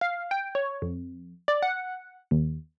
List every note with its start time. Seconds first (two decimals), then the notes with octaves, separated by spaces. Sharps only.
0.01 F5
0.31 G5
0.55 C#5
0.82 F2
1.48 D5
1.63 F#5
2.31 D#2